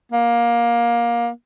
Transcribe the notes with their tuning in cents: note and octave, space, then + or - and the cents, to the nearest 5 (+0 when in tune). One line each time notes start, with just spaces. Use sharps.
A#3 +20